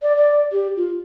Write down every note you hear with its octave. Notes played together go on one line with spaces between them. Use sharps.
D5
D5
G4
F4